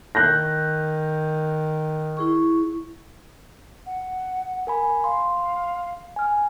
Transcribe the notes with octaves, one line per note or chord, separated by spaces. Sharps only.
D#3 F#6 G6 A#6
E4 G#4 C#6
F#5
A#4 G#5 B5
F5 C6
G#5 F6